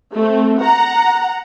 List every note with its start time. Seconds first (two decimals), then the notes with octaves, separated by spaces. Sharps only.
0.13 A3 C4
0.59 F#5 A#5